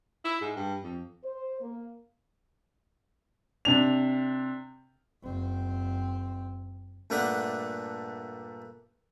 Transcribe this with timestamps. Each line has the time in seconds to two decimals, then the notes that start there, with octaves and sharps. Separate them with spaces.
0.25 E4
0.41 G#2
0.56 G2
0.83 F2
1.24 C5
1.60 A#3
3.65 C3 D4 F7
5.23 F#1 C4
7.10 G2 A#2 A3 D4 E5 F#5